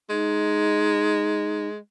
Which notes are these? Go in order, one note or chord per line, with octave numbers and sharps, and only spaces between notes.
G#3 D#4